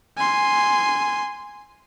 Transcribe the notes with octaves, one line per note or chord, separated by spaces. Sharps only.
G#5 C6